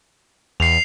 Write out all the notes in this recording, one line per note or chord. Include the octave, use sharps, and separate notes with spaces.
E2 C7 F7